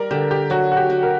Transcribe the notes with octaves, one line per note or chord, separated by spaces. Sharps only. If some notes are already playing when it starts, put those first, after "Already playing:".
Already playing: G3 A#4 D5
D3 G4
G4
F#3 F#4
F#4
G4
F#4
A#4